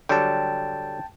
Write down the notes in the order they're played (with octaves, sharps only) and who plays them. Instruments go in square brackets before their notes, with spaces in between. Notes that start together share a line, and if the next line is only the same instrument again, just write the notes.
[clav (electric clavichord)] D3 F#3 G3 [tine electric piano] G5 A5